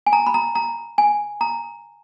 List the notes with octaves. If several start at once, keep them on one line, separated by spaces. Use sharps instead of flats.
G#5
A#5
B5
A#5
A#5
G#5
A#5